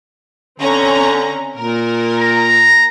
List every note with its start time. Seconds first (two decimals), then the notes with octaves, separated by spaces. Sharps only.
0.60 D3 C4 C#4 A#5
1.57 A#2 A#4
2.22 A#5